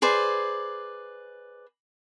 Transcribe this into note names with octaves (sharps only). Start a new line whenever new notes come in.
G#4 B4 C5 D5